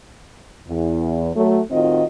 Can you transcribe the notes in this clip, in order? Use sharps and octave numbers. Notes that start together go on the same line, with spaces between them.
E2
F#3 A3
A2 D#3 C4 F4 F#4 D#5